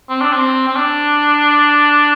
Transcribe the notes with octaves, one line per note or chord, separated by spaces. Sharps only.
C4
D4
C4
C4
D4